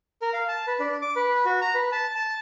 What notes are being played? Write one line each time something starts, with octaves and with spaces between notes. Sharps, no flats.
A#4
F5
A5
B4
D4
D6
B4
F#4
A#5
B4
A5
A5